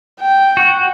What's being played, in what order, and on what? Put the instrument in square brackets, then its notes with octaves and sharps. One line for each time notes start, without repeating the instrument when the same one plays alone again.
[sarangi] G5
[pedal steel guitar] F#4